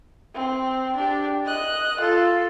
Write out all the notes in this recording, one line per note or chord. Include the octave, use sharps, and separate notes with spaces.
C4
D4 G4
D#5 F#6
F4 A4